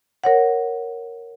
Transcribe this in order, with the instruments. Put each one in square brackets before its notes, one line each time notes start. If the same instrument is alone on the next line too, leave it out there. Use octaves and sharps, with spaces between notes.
[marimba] A#4 C#5 F#5